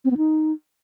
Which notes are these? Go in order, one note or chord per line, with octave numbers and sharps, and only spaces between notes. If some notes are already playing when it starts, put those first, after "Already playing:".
C4
B3
D#4